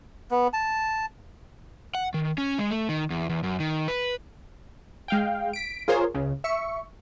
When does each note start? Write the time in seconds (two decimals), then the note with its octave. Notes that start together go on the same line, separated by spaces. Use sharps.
0.31 B3
0.54 A5
1.95 F#5
2.14 D#3
2.38 C#4
2.58 G#3
2.71 A3
2.89 D#3
3.10 E2
3.30 E2
3.43 F#2
3.60 D#3
3.88 B4
5.08 G#3 F5 G5
5.53 B6 D7
5.88 F4 G#4 A#4 C5 C#5
6.14 C#2 C#3
6.44 E5 C#6